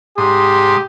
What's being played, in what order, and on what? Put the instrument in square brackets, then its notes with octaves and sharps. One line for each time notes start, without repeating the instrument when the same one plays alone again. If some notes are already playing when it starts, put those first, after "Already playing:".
[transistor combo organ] G#2 C6 D#6 [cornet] G4